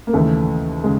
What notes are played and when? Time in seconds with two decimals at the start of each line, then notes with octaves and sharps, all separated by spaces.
0.07 A#3
0.13 D#2 C#3 E3 A3
0.84 C#3 G#3